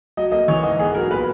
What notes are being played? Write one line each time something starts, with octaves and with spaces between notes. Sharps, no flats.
F#3 D#5
A#3 D#5
E3 C#5
G#2 D#5
B3 G#4
F#3 A#4
A#2 B4